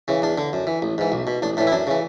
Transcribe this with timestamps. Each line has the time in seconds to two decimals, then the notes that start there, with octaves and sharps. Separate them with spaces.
0.08 C#3 E3
0.22 E2 D4
0.38 D3
0.53 F#2
0.67 E3
0.82 A1
0.98 G#2 E3
1.12 B1
1.27 B2
1.42 A1 D4
1.57 A2 D4
1.61 E3
1.67 E4
1.72 F#2 D4
1.87 C#3 E3